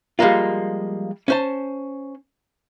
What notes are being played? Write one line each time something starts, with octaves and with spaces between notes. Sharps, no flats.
F3 G3 G#3 A#3 F4
C#4 C5 A5